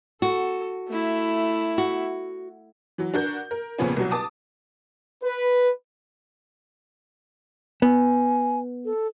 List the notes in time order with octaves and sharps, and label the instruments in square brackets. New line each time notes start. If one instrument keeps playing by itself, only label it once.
[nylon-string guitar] F#4 [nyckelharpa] A4
[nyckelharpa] A3 E4
[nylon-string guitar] F#4
[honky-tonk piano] E3 F#3
D4 F#4 A#4 G6
A#4
F2 A#2 C#3 F3 B3 C#4
C2 B2 F#3
A5 D6 D#6
[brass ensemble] B4
[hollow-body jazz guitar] B3 [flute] G#5
[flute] A4